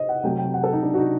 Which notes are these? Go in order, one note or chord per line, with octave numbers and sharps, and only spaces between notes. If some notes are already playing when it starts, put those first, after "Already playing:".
Already playing: C5 D#5
F#5
C3 F#3 A3 G5
G5
F#5
A4
D#4
D4
F#4
D#4